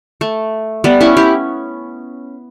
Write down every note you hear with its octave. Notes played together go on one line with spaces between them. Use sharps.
A3
G3 B3
C#4 E4
E4 G4